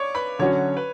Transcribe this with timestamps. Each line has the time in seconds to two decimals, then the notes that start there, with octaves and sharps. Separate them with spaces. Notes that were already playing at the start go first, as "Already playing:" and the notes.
Already playing: C#5 D5 C#6 D6
0.15 B4 B5
0.39 D3 F#3 C#4 F#4 C#5
0.77 B4